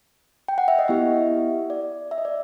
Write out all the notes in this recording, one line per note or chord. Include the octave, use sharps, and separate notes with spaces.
G5
F#5
E5
D#5
B3 E4 G4 E5
D5
E5
D#5
D5